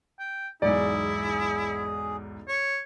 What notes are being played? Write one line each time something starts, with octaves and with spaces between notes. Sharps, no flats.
G5
B1 E2 G#2 E4 G#4 D5
C#5